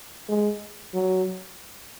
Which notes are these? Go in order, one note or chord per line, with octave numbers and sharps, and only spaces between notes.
G#3
F#3